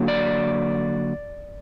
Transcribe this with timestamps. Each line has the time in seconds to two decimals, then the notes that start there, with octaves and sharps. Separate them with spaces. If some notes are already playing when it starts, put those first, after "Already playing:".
Already playing: D3 F#3 A#3
0.08 D5